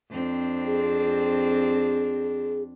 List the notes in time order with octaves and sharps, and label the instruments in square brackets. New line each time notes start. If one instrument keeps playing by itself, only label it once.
[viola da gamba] F2 C4 D4
[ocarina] G#4